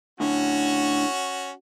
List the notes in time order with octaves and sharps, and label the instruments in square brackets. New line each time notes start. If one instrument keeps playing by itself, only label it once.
[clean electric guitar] A2 D3 [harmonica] C#4 F#4